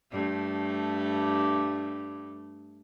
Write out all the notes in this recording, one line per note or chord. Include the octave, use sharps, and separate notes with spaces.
G2 A3